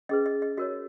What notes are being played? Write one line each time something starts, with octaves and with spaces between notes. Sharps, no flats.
C#4 G#4 B4 D#5
D#5
D#5
F#4 A#4 C#5 D#5